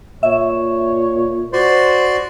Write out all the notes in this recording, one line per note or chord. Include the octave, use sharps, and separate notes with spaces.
A#2 C#5 E5
F#4 C5 D5 C6